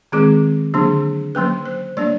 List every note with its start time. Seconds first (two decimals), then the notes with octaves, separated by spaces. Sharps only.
0.12 D#3 G#3 C4 G#4
0.74 D3 F#3 A#3 D4
1.35 F#3 A#3 C#4 B4
1.65 C5
1.97 G3 A#3 D4 D5